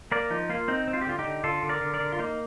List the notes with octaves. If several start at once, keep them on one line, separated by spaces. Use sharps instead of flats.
A#3 A#4 D5
F3 D#4
A#3 F4
C4 D#4
C4
F4
G4
D3 F4
D#4 G4
D3
D3 F4 A4
D3
A#4 D5
D3
A#4 D5
D3
F4
A#3 D#4